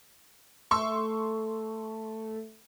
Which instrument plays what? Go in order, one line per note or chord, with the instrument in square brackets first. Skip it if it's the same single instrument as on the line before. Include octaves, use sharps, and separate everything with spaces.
[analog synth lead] A3 [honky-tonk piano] C6 C#6 E6